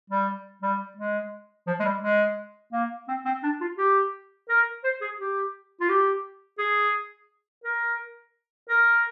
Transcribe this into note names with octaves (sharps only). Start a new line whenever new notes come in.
G3
G3
G#3
F3
G#3
G3
G#3
A#3
C4
C4
D4
F4
G4
A#4
C5
G#4
G4
F4
G4
G#4
A#4
A#4